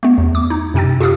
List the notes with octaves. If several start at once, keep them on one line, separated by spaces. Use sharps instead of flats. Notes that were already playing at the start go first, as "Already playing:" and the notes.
A3 B3
E2
D6
D#4
F#2 C3 D#4 G5 E6 A6
F4 G4 G#4 F5 D#6 E6